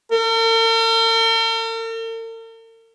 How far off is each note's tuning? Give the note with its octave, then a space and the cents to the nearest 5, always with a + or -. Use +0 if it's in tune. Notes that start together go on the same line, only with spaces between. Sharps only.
A#4 -45